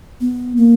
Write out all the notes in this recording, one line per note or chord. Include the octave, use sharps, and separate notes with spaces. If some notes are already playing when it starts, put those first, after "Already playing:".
B3
A#3